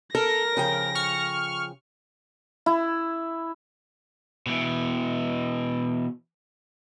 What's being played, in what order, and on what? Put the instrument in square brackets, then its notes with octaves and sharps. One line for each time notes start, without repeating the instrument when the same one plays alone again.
[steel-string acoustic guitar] A4 [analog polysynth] A#4 [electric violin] A#6
[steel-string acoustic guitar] C#3 F3 G5
[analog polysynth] C#6 F6
[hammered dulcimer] E4
[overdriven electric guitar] B2 E3